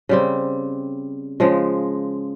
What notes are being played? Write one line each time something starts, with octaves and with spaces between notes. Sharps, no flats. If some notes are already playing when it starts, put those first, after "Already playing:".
C#3 G3 C4
C#3 F3 G#3